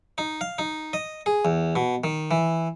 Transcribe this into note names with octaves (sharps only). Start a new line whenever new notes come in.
D#4
F5
D#4
D#5
G#4
E2
B2
D#3
E3